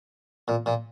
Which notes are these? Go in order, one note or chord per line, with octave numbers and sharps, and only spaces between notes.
A#2
A#2